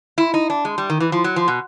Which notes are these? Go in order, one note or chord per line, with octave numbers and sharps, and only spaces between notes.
E4
D#4
D4
G#3
G3
D#3
E3
F3
F#3
F3
B2